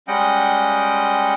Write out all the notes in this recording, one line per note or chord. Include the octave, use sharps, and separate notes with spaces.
G3 G#3 C#4 D#5 F#5 G5